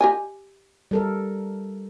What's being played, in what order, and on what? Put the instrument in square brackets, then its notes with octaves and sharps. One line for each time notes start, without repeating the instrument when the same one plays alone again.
[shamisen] G4 D#5 G#5
[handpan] G3 A4 A#4